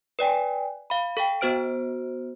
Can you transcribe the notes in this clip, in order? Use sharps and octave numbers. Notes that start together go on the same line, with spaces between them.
B4 D5 G5 G#5
F5 B5
A4 F5 G5
B3 F#4 C5 F6 D7